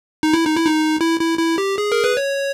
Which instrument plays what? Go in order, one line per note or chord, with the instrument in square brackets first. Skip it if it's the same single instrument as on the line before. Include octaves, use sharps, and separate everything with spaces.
[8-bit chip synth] D#4
E4
D#4
E4
D#4
E4
E4
E4
G4
G#4
A#4
B4
C#5